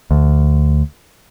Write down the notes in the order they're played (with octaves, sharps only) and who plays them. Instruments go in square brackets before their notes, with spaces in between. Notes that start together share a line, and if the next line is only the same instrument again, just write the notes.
[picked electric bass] D2